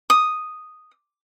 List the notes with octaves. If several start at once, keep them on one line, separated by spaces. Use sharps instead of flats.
D#6